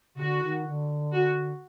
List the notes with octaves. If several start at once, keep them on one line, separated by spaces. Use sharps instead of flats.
C#3
D3 F#4
D#3
D3
F#4